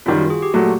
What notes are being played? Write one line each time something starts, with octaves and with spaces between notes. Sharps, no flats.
F#2 D#3 G3 F4
F#4
G#4
G4
A#2 F#3 A3 F#4